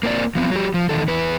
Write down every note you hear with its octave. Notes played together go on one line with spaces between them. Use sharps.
A#3 C4 F#4 D5
F3 B3 C4
F#3 G4
F3
E2 G#2 D#3 A4
E2 E3 B4